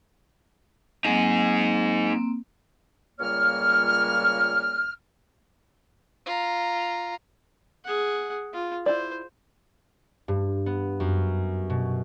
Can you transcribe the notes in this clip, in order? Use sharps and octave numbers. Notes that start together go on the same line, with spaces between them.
F#3 A#3 C4 D#4 G#4
A#3 C4
C#2 A#2 G3 A#3 C#5 F6
F4 A#5
G#4 F#5
F4
E4 C5 D5
G2
B3
F#2
B2